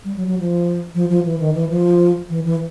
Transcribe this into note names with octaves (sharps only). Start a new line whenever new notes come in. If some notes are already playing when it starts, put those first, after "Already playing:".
G3
F#3
F#3
F3
F3
F3
E3
D#3
E3
F3
E3
E3